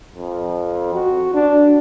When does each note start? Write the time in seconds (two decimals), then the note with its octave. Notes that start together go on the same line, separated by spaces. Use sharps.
0.16 F2
0.95 F#4
1.34 D4